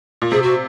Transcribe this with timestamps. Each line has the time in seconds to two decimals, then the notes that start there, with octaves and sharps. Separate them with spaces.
0.22 A#2
0.31 C3 G#4
0.42 F#4